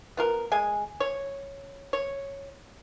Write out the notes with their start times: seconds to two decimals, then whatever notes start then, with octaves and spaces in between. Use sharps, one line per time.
0.17 B3 F4 A#4
0.52 G#3 G#5
1.00 C#5
1.93 C#5